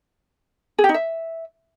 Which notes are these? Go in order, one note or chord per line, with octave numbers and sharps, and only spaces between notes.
G#4
G4
D#4
E5